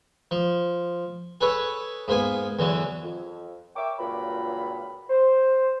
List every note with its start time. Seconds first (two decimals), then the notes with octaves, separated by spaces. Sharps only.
0.31 F3
1.41 G#4 A4 B4 C#5
2.08 G#2 A#3 B3 G#5
2.59 E2 D3 F#3
3.03 F2
3.76 A#4 C#5 E5 G5 C#6 D6
3.99 C#2 G2 A#2 F#3 B5
5.10 C5